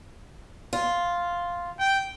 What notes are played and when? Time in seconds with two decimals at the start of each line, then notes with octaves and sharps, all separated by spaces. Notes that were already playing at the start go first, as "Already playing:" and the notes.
0.73 F4
1.79 G5